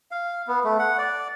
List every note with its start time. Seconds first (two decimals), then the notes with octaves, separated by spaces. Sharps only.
0.11 F5
0.47 B3
0.64 A3
0.79 F#5
0.98 D5